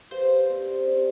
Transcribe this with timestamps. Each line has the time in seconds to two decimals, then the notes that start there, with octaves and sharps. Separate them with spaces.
0.11 G4 B4 C5 F5
0.50 C4 G4 D5
0.87 C4 G4 D5